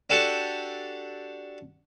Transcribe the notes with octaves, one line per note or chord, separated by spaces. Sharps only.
D4 F#4 G4 A4 F#5